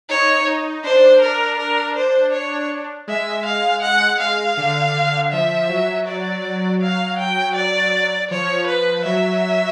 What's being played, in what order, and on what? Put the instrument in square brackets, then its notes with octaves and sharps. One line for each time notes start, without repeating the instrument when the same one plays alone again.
[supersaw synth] D#4 [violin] C#5
[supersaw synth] D#4
[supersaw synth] D4 [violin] C5
[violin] A#4
A#4
C5
C#5
[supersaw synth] G#3 [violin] E5
[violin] F5
F#5
F5
[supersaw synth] D3
D3
[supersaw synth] F3 [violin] E5
[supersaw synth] F#3
[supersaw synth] F#3 [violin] D5
[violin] F5
G5
D5
[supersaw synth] F3 [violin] C#5
[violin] B4
[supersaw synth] F#3 [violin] E5